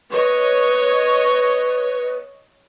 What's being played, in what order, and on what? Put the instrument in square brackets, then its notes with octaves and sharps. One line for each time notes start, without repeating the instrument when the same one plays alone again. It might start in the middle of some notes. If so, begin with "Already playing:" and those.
[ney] B4 [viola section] C#5 D#5